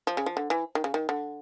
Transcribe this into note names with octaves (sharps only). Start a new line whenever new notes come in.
F3
C#3
F3
D3
E3
D#3
C#3
D#3
D3